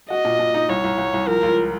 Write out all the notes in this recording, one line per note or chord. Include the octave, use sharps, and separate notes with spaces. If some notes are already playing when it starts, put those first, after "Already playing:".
F#4 D#5
A#2
A#2
D#4
C2 C#5
C2
C2
C2
F3 A#4
C#2